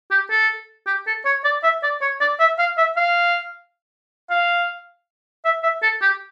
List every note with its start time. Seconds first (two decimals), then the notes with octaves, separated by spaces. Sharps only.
0.11 G4
0.31 A4
0.87 G4
1.07 A4
1.25 C#5
1.45 D5
1.64 E5
1.83 D5
2.02 C#5
2.21 D5
2.40 E5
2.59 F5
2.78 E5
2.97 F5
4.31 F5
5.45 E5
5.63 E5
5.83 A4
6.02 G4